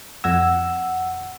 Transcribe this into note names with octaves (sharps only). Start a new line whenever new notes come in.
F2 F#5 E6 G#6 A#6